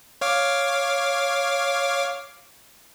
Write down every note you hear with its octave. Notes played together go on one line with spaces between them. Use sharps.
C#5 F5 D6